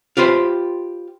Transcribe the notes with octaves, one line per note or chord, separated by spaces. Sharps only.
F4 G4 B4 C5